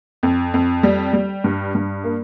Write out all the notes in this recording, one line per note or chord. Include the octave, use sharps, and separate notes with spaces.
F2
F2
G3
G3
G2
G2
A#3